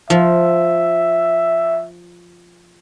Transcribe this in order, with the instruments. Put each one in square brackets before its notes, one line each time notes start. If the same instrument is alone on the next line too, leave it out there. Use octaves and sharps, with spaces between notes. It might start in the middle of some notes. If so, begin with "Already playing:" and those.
[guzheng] F3 [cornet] E5